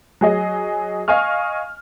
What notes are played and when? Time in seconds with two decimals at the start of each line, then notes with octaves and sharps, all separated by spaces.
0.21 F#3 G#4 D#5
1.08 D#5 F5 G#5 C#6 F6